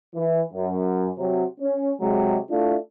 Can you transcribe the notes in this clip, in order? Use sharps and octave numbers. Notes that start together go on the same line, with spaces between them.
E3
F#2
C3 F#3
C#4
C3 F#3 G#3
A3 D4 E4 F4